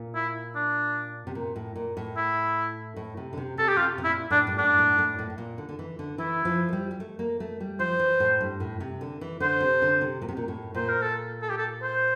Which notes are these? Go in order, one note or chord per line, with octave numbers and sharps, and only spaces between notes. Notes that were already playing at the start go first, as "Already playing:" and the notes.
Already playing: A#2
E4
D4
C3
A#2
A2
A#2
A2
E4
A2
C3
D3
C3
C3 A4
G4
C3 F4
C3
A#2 E4
A2 D4
G2
A2 D4
A2
A2
A2
A2
A#2
D3
D3
E3
D3
E3 E4
F3
A3
G3
G3
A3
A#3
A3
G3
F3 C5
E3
A2
G2
A2
C3
D3
E3
D3 C5
C3
D3
C3
A#2
C3
A#2
A2
A#2 C5
A#4
A4
A4
G4
A4
C5